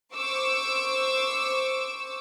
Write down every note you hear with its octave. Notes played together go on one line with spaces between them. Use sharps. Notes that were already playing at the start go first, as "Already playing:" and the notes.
C5 C#6 D6 E6